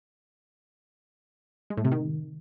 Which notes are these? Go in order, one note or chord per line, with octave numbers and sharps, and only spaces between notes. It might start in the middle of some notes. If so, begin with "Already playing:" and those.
G#3
A2
C3
D#3